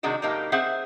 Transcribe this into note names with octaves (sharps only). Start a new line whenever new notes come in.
C3 D#3 G#3 D4 F#4
A2 F#3 A#3 D#4 G4
C4 G#4 C5 E5 F#5